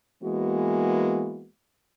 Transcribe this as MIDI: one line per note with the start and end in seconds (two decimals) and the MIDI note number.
0.23 1.48 52
0.23 1.48 56
0.23 1.48 58
0.23 1.48 59
0.23 1.48 66